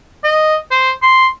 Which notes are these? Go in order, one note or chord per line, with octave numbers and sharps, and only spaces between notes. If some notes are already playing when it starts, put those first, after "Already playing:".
D#5
C5
C6